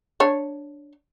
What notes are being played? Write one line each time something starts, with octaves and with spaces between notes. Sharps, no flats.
D4 C#5